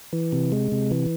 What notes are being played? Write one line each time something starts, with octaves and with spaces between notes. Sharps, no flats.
E3
C3
G#3
C3
E3